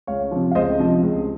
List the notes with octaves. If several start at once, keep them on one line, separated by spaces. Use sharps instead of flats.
C#2 C#5 F5
C3 F3
F5
C#2 C5 D#5
C3 F3
C#2